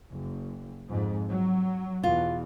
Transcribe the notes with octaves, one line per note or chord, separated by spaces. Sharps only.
F#1
F2 G#2
F#3
E2 B2 F4